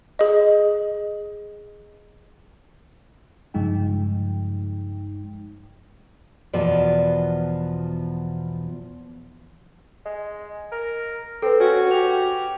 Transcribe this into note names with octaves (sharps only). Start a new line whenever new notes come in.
G#4 D#5
G2 C#3 F3 G#3 D#4 G5
E2 B2 F3 D5
G#3
A#4
C4 A4 B4
C#4 F#4
G4 F7